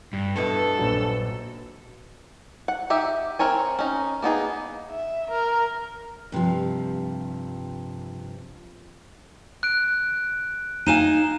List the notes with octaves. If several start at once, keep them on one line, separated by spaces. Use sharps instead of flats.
G2
G2 B2 E4 A4
A#1 F#3
F#5
D#4 G4 E5
C4 A#4 C#5 G#5
C#4 D#4
A#3 B3 D#4 G#4
E5
A#4
G2 C3 D#3 F3
F#6 D7
D#4 F5 G#5 D#7 E7